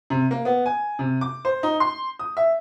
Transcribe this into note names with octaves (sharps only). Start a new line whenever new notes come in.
C3
A#3
B3
G#5
C3
D6
C5
D#4
C6
D#6
E5